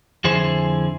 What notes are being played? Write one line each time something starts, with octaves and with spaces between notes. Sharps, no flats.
F2 D3 E4 G#4 C5